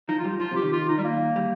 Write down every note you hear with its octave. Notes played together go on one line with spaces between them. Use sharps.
F3 D#4
F4
G3
F3 F4
C3 G4
D#3
F4
D#4
G3
A#3
G3